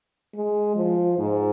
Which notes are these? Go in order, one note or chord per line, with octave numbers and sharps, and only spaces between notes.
G#3
F3
G#2